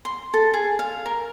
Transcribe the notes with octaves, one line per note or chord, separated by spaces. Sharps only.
C6
A4
G#4
F5
A#4